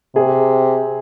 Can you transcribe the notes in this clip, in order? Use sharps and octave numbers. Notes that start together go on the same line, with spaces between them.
C3 G#4